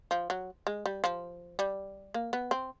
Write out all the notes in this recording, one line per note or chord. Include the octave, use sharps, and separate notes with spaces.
F3
F#3
G#3
G3
F3
G3
A#3
B3
C4